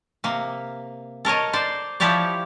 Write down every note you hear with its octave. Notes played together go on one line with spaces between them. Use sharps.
C3 A#3
A4 A#4 C#5 D#5
C5 D5
F3 E4 G4 C#5 D5